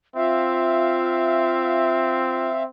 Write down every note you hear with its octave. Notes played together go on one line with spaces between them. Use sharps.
C4 F4 E5 F5